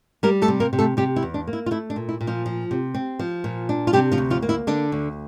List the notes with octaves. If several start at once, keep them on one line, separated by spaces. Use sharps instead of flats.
G3 A#3 A#4
A3 A4
C3
A#3 A#4
C3
A3 A4
C3 G3 G4
E4
E2
D4
A#3
E4
F4
A3 E4
D4
A#2
E4
A#2
F3 F4
F3
C3
C4
F3
A#2
D4
F4
C3 G3 G4
F3 F4
D2
F3 F4
A#3
E4
D3 D4
D2